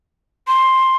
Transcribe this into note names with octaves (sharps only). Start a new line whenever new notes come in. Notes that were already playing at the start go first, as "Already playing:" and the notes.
C6